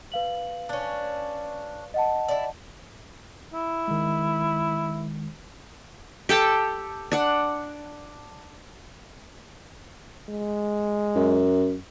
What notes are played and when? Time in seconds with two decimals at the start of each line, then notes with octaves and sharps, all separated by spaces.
0.12 B4 F5 F#7
0.69 C#4 D4
1.94 D#5 F#5 A5
2.28 E4 D5
3.54 E4
3.88 D#3 G#3
6.29 G4 A4 G5 A5
7.12 D4 F#5
10.29 G#3
11.15 F#2